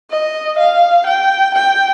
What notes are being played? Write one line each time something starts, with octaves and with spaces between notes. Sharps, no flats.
D#5
F5
G5
G5